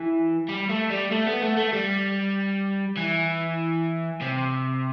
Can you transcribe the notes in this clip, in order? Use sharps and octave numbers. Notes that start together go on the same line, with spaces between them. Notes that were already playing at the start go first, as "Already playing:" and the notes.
Already playing: E3
G3
A3
G3
A3
B3
A3
A3
G3
E3
C3